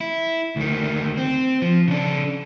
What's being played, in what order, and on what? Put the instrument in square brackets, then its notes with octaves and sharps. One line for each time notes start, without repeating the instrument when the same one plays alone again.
[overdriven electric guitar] E4
D2 D#3
C4
F3
C#3 D4